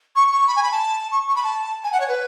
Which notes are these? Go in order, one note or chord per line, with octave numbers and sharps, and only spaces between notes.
C#6
C#6
B5
G#5
B5
A5
C#6
C#6
B5
A5
G#5
F#5
C#5
B4